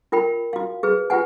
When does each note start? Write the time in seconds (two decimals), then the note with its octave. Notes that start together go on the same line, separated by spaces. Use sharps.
0.12 F4 A#4 G5 B5
0.53 F#4 F5
0.83 G#4 B4
1.10 F4 G4 B4 F#5 G#5